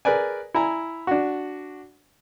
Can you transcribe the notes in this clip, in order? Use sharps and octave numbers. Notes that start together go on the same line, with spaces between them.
G#4 A#4 B4 D5 G#5
E4 G#5 A#5
D4 F#4